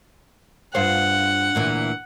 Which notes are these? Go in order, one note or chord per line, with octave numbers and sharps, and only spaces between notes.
G2 F4 C5 F#5
D2 A#2 E3